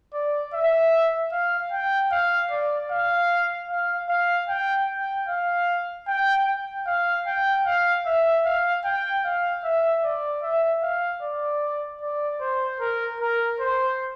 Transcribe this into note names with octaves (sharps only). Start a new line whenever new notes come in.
D5
E5
F5
G5
F5
D5
F5
F5
F5
G5
G5
F5
G5
G5
F5
G5
F5
E5
F5
G5
F5
E5
D5
E5
F5
D5
D5
C5
A#4
A#4
C5